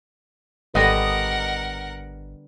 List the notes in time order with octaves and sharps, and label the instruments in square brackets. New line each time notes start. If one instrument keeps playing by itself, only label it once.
[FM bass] G#1 [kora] D3 G3 B3 [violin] A#4 F#5 [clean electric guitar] D#5